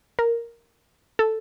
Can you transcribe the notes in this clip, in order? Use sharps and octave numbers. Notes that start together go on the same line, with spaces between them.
A#4
A4